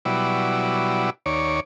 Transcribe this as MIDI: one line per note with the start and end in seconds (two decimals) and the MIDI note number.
0.05 1.10 47
0.05 1.10 54
0.05 1.10 55
0.05 1.10 64
0.05 1.10 74
1.26 1.60 39
1.26 1.60 73
1.26 1.60 74